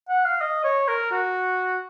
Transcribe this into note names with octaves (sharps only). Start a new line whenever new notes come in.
F#5
F5
D#5
C#5
A#4
F#4